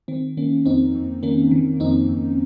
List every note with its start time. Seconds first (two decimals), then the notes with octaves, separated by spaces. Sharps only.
0.08 D#3 C4
0.37 D#3 A#3 C#4
0.66 F2 C4 D#4
0.95 F2
1.23 D#3 A#3 C#4
1.51 D#3
1.80 F2 C4 D#4
2.09 F2